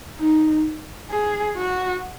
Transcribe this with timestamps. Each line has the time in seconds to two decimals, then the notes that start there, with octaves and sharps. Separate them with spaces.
0.19 D#4
1.11 G#4
1.57 F#4